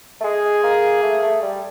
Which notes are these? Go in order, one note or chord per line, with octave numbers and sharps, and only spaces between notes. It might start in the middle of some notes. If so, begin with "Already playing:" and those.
A3
G#3 G#4
A#3
A3
A3
G3